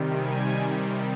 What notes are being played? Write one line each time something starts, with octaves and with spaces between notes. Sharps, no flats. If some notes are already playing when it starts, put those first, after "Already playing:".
Already playing: C3 D#3 G3
G#5